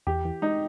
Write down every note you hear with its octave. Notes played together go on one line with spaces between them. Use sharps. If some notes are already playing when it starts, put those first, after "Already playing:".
E2 G4
E3
G#3 D#4